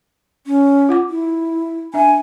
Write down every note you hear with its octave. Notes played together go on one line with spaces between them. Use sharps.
C#4
F4 F#5 D6
E4
D4 E5 G#5